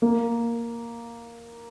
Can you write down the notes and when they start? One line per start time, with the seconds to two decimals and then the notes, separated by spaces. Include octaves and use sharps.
0.02 A#3